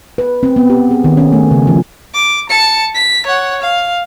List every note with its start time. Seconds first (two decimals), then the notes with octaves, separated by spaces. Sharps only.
0.18 B4
0.43 C4
0.56 B3
0.70 G4
0.91 G#4
1.04 D#3
1.17 C#4
1.33 A3
1.51 C#3
1.67 F3
2.14 D6
2.49 A5 C#7
2.95 B6
3.26 C#5 F#5
3.62 F5